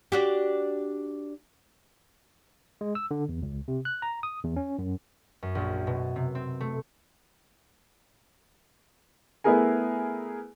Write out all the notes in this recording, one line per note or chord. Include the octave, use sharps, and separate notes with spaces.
D4 F#4 G4
G#3
E6
D3
E2
C#2
C3
F#6
A#5
D#6
E2
C#4
F#2
F#2
A#1
B2
C3
C4
A3
A3 B3 E4 G#4 A#4 G#5